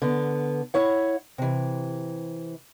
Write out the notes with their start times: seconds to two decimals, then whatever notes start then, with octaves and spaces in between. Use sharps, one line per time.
0.02 D3 B3
0.74 E4 C#5 F#5
1.38 C3 E3